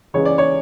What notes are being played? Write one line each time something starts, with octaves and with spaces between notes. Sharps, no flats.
C#2 C#3 E3 G#3 C#4 C#5
D5
C#5